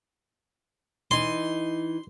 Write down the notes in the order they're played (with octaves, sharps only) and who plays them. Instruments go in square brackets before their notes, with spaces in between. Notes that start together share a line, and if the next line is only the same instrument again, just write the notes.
[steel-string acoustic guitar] E3 D#4 [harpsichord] C6